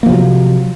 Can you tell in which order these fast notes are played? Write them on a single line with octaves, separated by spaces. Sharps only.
A#3 F3 C3 F#3